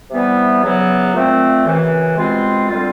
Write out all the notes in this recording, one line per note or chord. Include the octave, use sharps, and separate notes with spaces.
C3 E3 G3 B3
E2 C#3 F#3 B3
A#2 F3 A3 C4
F#2 C#3 E3
C2 B2 G#3 C4 F4
D3 G3 C4 F4